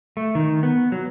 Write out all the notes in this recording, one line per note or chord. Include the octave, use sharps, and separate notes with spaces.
A3
D#3
B3
F#3